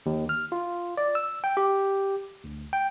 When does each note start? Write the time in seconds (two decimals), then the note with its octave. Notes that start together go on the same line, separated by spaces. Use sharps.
0.06 D#2
0.29 F6
0.52 F4
0.97 D5
1.15 E6
1.44 G5
1.57 G4
2.44 D2
2.73 G5